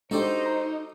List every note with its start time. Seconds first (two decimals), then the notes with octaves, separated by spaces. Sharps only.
0.11 G#3 D4 D#4 F#4 G4 A4 C5 D5
0.46 A#5 C6